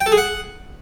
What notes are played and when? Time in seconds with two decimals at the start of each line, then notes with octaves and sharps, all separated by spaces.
0.01 G5
0.06 A4
0.12 G#4
0.17 F#5